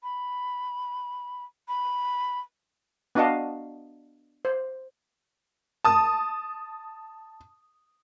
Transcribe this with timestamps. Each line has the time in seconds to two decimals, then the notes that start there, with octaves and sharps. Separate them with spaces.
0.03 B5
1.68 B5
3.15 B3 D4 F#4 D#5 F5 A5
4.45 C5
5.85 A5 D#6